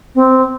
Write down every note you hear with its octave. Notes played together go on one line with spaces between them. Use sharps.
C4